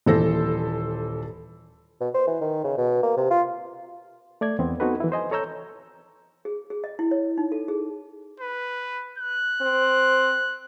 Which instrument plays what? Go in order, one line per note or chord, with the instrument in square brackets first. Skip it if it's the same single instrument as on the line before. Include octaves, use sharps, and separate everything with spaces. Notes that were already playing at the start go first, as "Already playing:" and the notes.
[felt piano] D#1 E3 A4 C5 A#6
[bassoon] B2
C5
E3
D#3
C#3
B2
A#3
C3
F4
[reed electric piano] A3 D5 G#6
E2 B3 C4
B3 C4 D#4 F#4 A4 B4
E3 E4
C5 D#5 G#5
A4 C#5 A#5 E6 G6
[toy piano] G#4
G#4
D#5
E4
C#5
D#4
A4
G#4
[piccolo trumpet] B4
F#6
[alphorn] C4